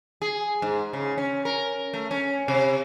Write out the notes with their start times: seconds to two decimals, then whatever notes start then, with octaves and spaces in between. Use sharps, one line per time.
0.22 G#4
0.62 G#2
0.93 C#3
1.18 C#4
1.45 A#4
1.94 A3
2.11 C#4
2.48 C3